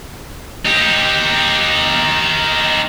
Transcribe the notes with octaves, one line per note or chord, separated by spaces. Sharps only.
D#4 G4